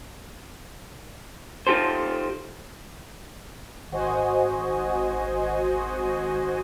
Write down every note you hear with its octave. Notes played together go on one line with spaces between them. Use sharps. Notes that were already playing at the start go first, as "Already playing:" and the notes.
D#4 F4 G4 A4 C5
G#1 F#4 C5 D#5 G#5